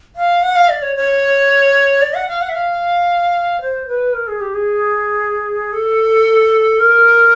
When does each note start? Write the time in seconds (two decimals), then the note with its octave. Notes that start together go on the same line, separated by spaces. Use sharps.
0.16 F5
0.42 F#5
0.55 F5
0.69 D5
0.82 C#5
0.96 C#5
2.02 D5
2.14 F#5
2.28 F5
2.41 F#5
2.49 E5
2.55 F5
3.61 C5
3.87 B4
4.13 A#4
4.27 G#4
4.41 G4
4.54 G#4
5.73 A4
6.79 A#4